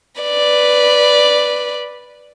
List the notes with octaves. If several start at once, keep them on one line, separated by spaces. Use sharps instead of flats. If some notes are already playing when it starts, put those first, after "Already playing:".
B4 D5